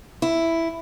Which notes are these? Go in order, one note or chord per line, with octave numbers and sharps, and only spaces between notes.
E4